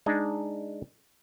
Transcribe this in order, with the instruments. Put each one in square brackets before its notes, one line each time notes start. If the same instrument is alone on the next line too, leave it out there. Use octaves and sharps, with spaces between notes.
[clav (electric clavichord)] G#3 D4 D#4